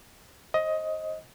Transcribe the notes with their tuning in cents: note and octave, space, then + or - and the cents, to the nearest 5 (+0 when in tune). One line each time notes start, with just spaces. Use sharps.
C5 +35 D#5 +15